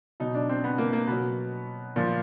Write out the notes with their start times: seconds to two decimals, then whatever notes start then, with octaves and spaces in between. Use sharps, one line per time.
0.20 B2 F#3 D#4
0.35 D4
0.49 C4
0.64 B3
0.78 A#3
0.93 A#3
1.07 B2 F#3 B3
1.96 A#2 F3